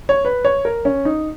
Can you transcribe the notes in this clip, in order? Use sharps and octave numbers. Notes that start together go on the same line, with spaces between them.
C#5
B4
C#5
A#4
C#4
D#4